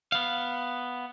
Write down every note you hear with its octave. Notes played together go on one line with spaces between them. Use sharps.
B3 F5